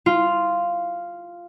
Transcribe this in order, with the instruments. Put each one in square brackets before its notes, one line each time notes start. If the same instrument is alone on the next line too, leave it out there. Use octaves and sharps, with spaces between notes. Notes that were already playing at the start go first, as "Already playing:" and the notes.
[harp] F4